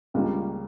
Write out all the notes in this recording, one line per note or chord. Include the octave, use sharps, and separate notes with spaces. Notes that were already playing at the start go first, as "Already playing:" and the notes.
C#2 C#3 G3 A#3 C#4